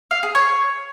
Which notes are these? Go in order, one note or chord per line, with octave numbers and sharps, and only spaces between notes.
F5
G#4
C#5